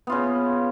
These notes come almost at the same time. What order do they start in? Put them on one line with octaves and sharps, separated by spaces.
B3 F4 C#3